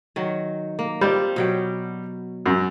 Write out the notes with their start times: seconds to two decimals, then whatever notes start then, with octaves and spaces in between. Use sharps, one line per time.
0.16 D#3 F#3
0.79 A#3
1.01 G3 C4 F4
1.36 B2 F#3 G5
2.46 F#2